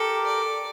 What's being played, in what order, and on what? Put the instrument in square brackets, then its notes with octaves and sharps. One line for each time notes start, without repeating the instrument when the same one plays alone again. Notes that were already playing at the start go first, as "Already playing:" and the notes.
Already playing: [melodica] G4 A#4 [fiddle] A4
[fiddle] D5